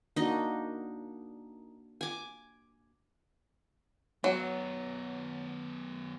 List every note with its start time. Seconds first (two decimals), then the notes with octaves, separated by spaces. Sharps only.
0.16 A#3 D4 D#4 F#4 D#5
2.01 G#5 D6
4.24 F#2 F#3 B3